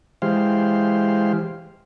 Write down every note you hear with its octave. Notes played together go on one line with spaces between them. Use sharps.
E3 G#3 G4 C5 F5